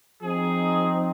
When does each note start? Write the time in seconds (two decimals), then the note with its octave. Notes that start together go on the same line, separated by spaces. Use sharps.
0.22 F3 C4 D#4 G#4